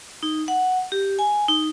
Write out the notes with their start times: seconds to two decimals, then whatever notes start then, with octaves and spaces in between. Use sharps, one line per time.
0.23 D#4
0.48 F#5
0.92 G4
1.19 G#5
1.48 D#4